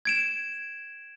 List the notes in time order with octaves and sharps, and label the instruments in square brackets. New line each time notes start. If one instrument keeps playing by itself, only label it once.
[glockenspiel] G#6 D7 E7